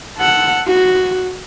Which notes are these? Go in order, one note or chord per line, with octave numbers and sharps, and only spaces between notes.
A4 F#5
F#4